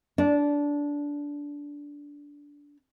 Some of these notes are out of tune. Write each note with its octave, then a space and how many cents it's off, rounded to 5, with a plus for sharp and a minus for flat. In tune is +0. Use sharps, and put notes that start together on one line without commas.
D4 -15